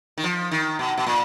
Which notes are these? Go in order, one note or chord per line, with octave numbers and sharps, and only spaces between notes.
D#3
F3
D#3
B2
B2
A#2